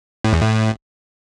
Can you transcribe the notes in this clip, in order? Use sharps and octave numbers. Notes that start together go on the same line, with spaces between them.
A2
E2
A2